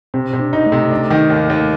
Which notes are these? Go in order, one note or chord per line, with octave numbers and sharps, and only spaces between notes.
C3 C4
C3
D4
D#4
A3
C3
D4
D#3
D#2
D#2